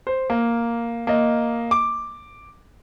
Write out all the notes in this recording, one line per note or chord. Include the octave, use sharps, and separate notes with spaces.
C5
A#3
A#3 D#5
D6